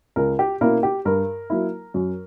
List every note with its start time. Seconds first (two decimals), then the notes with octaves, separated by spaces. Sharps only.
0.16 C#2 A#4
0.39 G4
0.61 B2 A#3 C#4 E4 A#4
0.83 G4
1.05 G2 A#4
1.50 F#3 A#3 E4
1.94 F#2